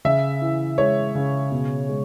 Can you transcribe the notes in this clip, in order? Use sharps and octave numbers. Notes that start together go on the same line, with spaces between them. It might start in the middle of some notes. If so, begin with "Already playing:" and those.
C#3 E5
E3
G#3 C#5
C#3
B2
G#3